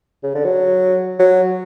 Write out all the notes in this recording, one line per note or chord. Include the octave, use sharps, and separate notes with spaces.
C#3
D3
F#3
F#3